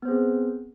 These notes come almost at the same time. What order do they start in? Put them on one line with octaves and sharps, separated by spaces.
B3 C5 G#4 C4